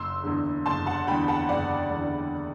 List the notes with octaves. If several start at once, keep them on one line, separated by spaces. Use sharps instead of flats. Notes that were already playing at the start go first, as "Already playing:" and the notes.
Already playing: F#1 C6 E6
E2 D3
F#1 A5 C6
F#5 A5
E2 D3 G5 B5
F#5 A5
F#1 D5 F#5
E2
D3